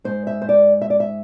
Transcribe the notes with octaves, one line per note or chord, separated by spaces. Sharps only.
G#2 G#3 C5
E5
C5
D5
E5
D5
E5